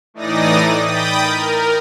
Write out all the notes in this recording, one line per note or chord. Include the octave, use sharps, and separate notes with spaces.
A2 E3 D#4 D5 D#6 A#6
G5 B5 D#6 G6 A6
A#4